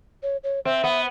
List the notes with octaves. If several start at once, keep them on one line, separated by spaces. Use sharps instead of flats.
C#5
C#5
C4 E5
B3